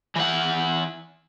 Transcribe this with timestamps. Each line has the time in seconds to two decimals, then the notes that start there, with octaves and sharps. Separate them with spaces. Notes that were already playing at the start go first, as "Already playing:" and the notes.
0.16 E3 F#5